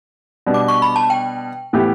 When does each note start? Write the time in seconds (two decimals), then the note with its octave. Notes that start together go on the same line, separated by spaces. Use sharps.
0.46 B2 G3 D4
0.54 D6
0.68 C#6
0.82 B5
0.96 A5
1.10 G5
1.73 A2 E3 B3 E4 G4